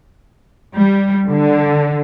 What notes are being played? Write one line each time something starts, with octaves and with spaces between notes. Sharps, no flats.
G3
D3